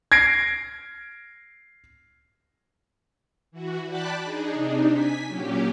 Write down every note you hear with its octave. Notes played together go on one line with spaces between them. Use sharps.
G#6 A#6 C7 D7
E3 F#4
D5 G5 A5 B5 D6 F#6
D4 D#4 G#4
C3 D4 D#4
G#5 B6
A#2 F#3 C#4 G4